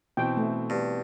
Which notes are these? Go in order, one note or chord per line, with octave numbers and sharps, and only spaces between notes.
B2 E3 C4 G5
A3
G2